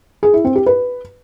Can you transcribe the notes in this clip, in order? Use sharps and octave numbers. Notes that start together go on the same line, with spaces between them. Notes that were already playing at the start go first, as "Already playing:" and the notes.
G#4
E4
C4
G4
B4